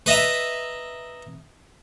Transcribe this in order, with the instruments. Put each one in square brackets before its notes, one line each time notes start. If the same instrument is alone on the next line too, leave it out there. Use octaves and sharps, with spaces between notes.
[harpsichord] B4 D#5 E5 A#5